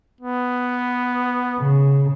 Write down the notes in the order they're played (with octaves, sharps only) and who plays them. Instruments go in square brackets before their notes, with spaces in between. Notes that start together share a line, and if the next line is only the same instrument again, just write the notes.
[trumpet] B3
[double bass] C#3